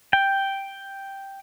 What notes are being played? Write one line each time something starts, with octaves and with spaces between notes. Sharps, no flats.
G5